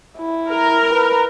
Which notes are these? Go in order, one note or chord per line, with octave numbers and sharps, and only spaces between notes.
E4
A#4
B4